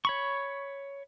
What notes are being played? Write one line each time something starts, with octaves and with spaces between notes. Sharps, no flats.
C#5 B5 C#6